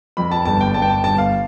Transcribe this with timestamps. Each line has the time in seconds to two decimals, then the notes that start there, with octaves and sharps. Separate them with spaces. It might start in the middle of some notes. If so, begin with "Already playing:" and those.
0.17 F2 B5
0.32 A5
0.45 G1 A5
0.61 G5
0.74 G1 A5
0.82 G5
0.90 A5
1.04 G1 A5
1.18 F5